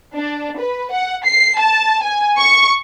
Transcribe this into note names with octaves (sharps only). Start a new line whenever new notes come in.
D4
B4
F#5
C7
A5
G#5
C#6